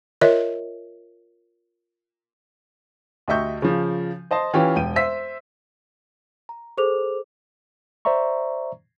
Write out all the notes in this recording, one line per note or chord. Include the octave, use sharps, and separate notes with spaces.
F4 A#4 C#5 D#5 E5
D2 G4 D#5 E5 C#6 G6
C#3 F3
C5 D#5 A5 C6
E3 C#4 F4 G4
E1 G5 D#7
C5 E5 C6 E6 B6
A#5
G#4 A4 C5 D6 F7
C5 D5 E5 A#5 C#6